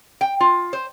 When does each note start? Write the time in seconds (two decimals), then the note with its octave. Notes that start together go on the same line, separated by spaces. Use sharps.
0.21 G5
0.41 F4
0.73 C5